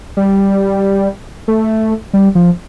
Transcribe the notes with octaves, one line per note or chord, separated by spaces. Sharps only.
G3
A3
G3
F3